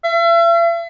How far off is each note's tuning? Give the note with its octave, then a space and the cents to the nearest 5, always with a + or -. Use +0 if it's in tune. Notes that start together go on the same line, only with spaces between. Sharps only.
E5 +40